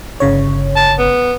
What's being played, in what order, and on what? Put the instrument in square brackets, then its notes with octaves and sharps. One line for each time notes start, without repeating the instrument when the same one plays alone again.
[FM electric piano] G1 C#3 C#5
[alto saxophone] A5
B3